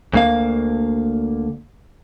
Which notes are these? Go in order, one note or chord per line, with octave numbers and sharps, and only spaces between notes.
D2 A#3 F5